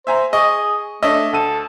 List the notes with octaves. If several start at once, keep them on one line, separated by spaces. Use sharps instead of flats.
C5 E5 G#5 A#5
G#4 D#5 C#6
A3 D4 C#5 D#5 E5
D2 A4 D#7